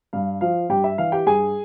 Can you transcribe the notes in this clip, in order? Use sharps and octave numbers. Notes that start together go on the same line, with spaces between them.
G2 F5
F3 F5
G2 G4 G5
E5
E3 F5
G4 G5
G2 G#4 G#5